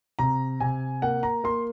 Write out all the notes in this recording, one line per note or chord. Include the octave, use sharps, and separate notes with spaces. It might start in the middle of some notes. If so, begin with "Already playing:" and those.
C3 A#5
C3 G#5
A#3 F#5
A#5
A#3 C6